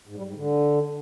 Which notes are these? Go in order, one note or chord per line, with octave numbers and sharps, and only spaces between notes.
G#2
G3
G#2
D3